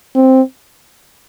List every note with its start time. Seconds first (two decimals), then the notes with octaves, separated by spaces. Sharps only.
0.15 C4